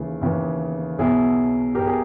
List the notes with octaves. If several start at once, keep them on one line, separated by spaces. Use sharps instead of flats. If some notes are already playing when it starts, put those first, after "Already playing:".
Already playing: D#2 C#3 E3 E4 G#4
D#2 C#3 E3
B1 B2 E4 G#4
B1 B2 G4 A#4
G#4